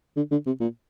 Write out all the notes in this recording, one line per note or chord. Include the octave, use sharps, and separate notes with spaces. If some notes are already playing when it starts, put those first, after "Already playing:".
D3
D3
C3
A#2